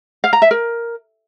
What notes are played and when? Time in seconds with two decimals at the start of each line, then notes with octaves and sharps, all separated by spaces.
0.24 F5
0.33 A#5
0.42 E5
0.51 A#4